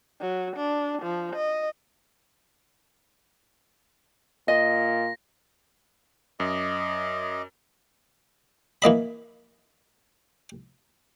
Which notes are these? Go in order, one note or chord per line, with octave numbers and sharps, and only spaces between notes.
F#3
D4
F3
D#5
A#2 D#5 A#6
F#2 D#5 D6
E3 A#3 D#5 B5